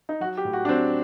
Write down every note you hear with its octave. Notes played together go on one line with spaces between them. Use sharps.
D#4
F#3 F#4
G4
A2
F#4
D4
F#3 C4